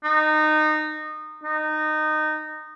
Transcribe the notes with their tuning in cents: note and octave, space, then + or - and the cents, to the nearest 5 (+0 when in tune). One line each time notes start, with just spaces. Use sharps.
D#4 -20
D#4 -20